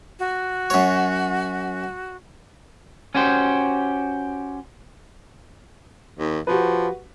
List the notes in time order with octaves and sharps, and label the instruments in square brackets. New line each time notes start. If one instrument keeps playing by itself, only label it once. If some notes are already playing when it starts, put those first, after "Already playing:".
[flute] F#4
[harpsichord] F#2 C#5
[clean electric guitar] C#4 F#4 G4 C5
[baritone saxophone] D#2
[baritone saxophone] F3 [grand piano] F#4 G4 B4